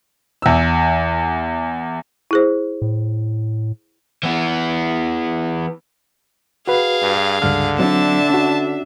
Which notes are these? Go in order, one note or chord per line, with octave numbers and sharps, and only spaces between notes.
E2 E6
E4 G#4 C5
A2
E3 B3
F#4 G#4 B4 F5
G2
C#2 G2 D3 F6
F#3 C4 D4 E5 A5
C#4 F#4